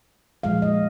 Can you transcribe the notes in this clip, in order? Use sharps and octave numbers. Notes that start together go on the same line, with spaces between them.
A#2 F3 G#3 F5
D#5